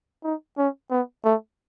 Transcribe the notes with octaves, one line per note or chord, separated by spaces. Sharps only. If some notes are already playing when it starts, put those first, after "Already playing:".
D#4
C#4
B3
A3